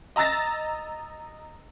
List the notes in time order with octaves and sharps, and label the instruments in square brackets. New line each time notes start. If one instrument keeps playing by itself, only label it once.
[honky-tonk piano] D#5 A#5 E6 A6 A#6